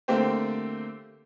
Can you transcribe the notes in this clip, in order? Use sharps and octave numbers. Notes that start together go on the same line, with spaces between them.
D3 A3 A#3 C4 G4 C5